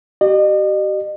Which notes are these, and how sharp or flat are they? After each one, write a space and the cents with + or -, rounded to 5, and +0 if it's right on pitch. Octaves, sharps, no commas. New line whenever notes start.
G4 -35 D#5 -40